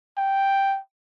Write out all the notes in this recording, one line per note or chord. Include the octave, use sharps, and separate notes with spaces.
G5